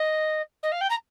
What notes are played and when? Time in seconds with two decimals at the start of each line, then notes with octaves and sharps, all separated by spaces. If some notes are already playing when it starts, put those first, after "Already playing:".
Already playing: D#5
0.63 D#5
0.72 F5
0.81 G5
0.90 A#5